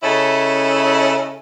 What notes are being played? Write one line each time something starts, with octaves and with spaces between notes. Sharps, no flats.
C#3 C#4 E4 A4 D#5